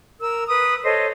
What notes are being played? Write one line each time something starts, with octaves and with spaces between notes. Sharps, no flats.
A#4 E6
B4 D#6
A4 C5 C#5 D#5